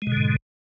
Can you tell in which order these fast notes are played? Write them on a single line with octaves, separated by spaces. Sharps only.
G#3 B2 D3 G#2